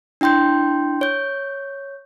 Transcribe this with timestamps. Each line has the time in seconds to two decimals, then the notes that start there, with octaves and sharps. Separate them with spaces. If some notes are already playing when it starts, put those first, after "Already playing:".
0.21 D4 E4 G5 C6 G6
1.01 C#5 G6